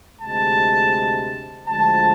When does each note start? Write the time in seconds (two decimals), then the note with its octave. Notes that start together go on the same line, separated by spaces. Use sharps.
0.21 D2 C3 G#3 A5
1.67 D2 D3 F3 G#3 A5